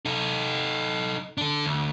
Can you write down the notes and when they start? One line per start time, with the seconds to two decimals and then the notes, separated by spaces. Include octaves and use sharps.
0.06 D#4 A4
1.38 D4 A4
1.65 D2